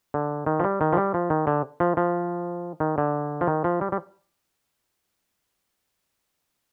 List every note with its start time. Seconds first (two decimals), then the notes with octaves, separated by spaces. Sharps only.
0.14 D3
0.46 D#3
0.60 F3
0.64 G3
0.81 D#3
0.93 F3
0.97 G3
1.14 F3
1.30 D#3
1.47 D3
1.80 F3
1.97 F3
2.80 D#3
2.98 D3
3.41 F3
3.47 D#3
3.64 F3
3.81 G3
3.92 G3